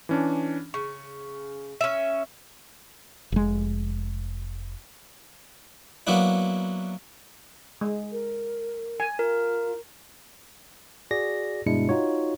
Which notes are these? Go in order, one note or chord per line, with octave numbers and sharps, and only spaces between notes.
E3 C#4 D4
C#3 C#6
C#4 E5
F1 G#3
F#3 A#3 B3 D4 E4
G#3
A#4
G#5
F4 A#4
F#4 G#4 D5 A#6
G2 B2 G#3 D4 E4 C#7
D#4 F4 F#4 C#5